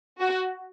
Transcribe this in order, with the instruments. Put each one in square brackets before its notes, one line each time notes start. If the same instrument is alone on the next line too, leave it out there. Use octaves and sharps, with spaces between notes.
[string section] F#4